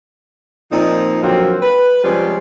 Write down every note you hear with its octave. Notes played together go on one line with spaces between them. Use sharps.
A#2 F3 C4 D#4
A#2 D3 F3 F#3 A#3 C4
B4
C3 F3 G3 G#3 C4 C#4